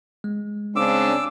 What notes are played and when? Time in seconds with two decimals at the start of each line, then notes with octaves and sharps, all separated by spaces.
0.24 G#3
0.76 C#3 C4 D4 D6 E6